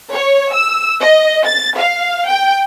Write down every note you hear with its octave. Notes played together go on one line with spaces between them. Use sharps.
C#5
E6
D#5
A6
F5
G5